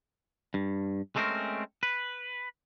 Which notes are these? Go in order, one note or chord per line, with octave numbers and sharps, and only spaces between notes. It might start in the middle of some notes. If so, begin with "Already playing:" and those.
G2
G#3 A3 C4 C#4 G#4 A#4
B4